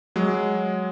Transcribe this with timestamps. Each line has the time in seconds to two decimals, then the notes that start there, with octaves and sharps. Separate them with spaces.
0.16 F#3 G#3